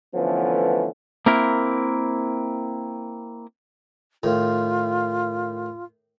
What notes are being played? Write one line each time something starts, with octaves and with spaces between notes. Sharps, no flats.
D3 E3 F3 A3 B3 C#4
A#3 C4 E4 A#4
A2 D#3 F4